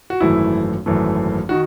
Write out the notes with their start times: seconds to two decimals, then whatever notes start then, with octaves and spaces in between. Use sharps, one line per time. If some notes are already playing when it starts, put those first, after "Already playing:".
0.10 F#4
0.20 G#1 F#2 E3 A3 E4
0.86 G#1 F#2 E3 A3
1.49 D#3 F#4